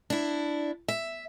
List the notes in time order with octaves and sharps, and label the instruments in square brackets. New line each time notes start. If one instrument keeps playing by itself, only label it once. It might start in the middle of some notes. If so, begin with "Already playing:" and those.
[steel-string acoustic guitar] D4 E4
E5